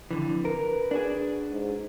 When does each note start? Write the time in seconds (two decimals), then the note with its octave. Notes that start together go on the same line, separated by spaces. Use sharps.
0.11 F2 D3 E3
0.45 A#4 B4
0.91 D4 F#4 G#4
1.51 G#2